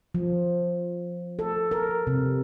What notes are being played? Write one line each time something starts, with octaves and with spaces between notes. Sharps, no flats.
F3
A4
A#4
C3